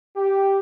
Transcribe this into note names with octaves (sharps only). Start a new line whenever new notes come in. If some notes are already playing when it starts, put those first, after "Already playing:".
G4